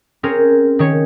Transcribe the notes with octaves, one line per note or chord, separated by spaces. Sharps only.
C4 C#4 G#4 A#4
D#3 C#4 C#5